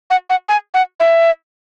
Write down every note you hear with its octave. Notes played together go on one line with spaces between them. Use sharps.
F#5
F#5
G#5
F#5
E5